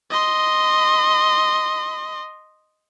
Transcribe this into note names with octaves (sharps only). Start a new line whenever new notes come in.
D#5 C6